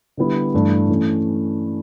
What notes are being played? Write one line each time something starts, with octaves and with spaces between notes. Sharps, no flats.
D3 G3 B3 E4 G4
G2 E3 A3
E3 A3 C#4